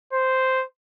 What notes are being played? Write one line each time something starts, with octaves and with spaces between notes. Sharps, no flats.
C5